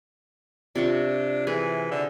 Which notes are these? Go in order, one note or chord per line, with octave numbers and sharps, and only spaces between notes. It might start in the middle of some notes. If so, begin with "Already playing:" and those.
C3 D4 F4 C#6
E3 G#4
D3